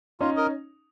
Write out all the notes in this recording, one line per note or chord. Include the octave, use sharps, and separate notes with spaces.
C#4 D#4 F4
A#4 D#5